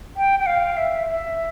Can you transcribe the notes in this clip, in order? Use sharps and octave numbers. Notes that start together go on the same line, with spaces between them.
G5
G5
F5
E5
F5
E5